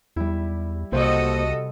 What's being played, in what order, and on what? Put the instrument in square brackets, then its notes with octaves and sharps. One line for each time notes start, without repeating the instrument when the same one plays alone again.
[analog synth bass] E2 [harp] G3 E4
[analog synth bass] C2 [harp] C3 [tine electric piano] A#3 C5 [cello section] F#4 A4 D#5